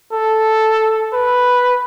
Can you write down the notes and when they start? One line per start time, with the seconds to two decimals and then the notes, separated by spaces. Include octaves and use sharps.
0.13 A4
1.14 B4